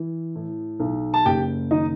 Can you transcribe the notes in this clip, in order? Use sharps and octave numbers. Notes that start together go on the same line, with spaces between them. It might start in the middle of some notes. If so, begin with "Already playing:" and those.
Already playing: E3
A2
B1
A5
F#1 G4 G5
D#3 D#4 D#5